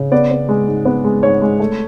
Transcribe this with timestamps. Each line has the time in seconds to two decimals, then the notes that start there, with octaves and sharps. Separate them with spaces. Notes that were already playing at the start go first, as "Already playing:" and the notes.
Already playing: C#3
0.12 B3 D5
0.31 B3
0.49 G#3
0.68 G#2
0.85 B3
1.05 G#3
1.23 G#2 C#5
1.42 G#3
1.60 A3